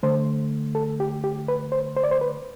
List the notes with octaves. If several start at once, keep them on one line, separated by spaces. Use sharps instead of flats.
D3 A3 C5
A4
G4
G4
B4
C5
C5
D5
C5
B4